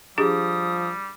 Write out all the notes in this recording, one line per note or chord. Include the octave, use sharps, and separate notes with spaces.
F3 G3 D4 G4 G#4 D#6